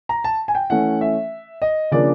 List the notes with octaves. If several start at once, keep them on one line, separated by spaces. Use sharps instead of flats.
A#5
A5
G#5
G5
E3 A3 C#4 F#5
E5
D#5
C#3 F3 A#3 D4 D5